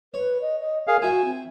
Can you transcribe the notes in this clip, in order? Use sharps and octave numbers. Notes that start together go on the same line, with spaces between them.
B4 C#5
D#5
D#5
G#4 A#4 F5
E4 F#4 E5 G5 G#5
C4